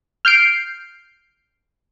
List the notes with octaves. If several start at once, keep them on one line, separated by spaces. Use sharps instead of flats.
F6 G6 C7 D7